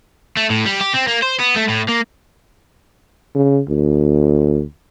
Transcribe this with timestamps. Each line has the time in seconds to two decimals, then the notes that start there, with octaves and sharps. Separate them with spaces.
0.37 A3
0.50 A2
0.65 G3
0.81 G4
0.94 C4
1.07 A#3
1.23 C5
1.40 B3
1.57 A3
1.69 A2
1.89 A#3
3.35 C#3
3.68 D2